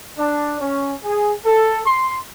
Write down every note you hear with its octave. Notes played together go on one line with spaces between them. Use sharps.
D4
C#4
G#4
A4
C6